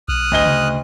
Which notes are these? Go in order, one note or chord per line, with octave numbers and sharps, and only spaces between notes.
B1 D#6 F6 F#6
D2 D#5 G7
C#3